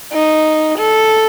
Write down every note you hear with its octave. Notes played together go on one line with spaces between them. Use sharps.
D#4
A4